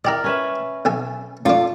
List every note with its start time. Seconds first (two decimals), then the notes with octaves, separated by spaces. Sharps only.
0.05 E4 G4 A#4 D5 D#5
0.24 C#4 B4 E5
0.85 B1 A4 G#5
1.45 F#2 A3 D4 F4